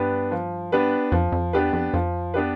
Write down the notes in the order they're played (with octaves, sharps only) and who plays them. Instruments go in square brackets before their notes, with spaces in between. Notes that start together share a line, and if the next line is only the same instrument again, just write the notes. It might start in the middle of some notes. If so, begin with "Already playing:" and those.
Already playing: [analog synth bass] G2 [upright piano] B3 D4 G4 B4
[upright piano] F3
B3 D4 G4 B4
[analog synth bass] F2 [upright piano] F3
[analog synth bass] F2
[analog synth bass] E2 [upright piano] B3 D4 G4 B4
[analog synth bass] F2
[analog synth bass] F2 [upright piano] F3
[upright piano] B3 D4 G4 B4